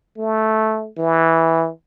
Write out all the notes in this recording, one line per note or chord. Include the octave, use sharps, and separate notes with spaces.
A3
E3